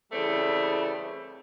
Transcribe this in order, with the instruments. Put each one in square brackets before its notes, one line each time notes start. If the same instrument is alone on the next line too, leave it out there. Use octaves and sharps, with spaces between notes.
[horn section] C#3 E3 G3 A3 C4